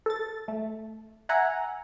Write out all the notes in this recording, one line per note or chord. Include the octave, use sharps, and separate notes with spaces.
A4 A6
A3
E5 F#5 G#5 A#5